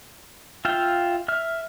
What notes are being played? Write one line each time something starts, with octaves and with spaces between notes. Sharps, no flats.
F4 E5 F5 G5
E5 F6